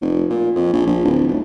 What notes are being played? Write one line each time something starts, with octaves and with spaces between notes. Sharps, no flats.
F1
A#2
F2
A#1
A#1
D1
D#1